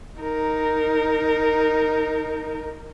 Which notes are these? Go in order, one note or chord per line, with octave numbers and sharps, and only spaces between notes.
D#4 A#4